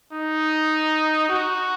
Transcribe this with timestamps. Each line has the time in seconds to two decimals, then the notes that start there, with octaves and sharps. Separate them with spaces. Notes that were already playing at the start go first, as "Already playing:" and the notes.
0.13 D#4
1.29 F#4